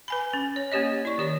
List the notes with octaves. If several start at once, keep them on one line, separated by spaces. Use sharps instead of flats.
B4 G#5 B5
C#4
C#5
A#3 C#4 G4 C#5 D#5
E4 D5 C#6
D#3 G4 C#5 D5